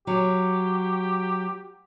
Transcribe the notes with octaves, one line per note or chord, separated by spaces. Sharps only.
F#3 G4